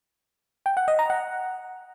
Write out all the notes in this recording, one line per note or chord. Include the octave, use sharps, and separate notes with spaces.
G5
F#5
D#5
A#5
F#5